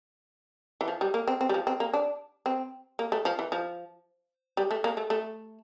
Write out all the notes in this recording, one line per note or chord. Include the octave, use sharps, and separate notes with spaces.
E3
F3
G3
A#3
C4
C4
G3
F3
C4
A#3
D4
C4
A#3
A3
F3
E3
F3
G3
A3
A#3
A3
A3